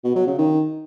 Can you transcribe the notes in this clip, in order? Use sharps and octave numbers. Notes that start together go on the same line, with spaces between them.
B2
F#3
C#3
D#3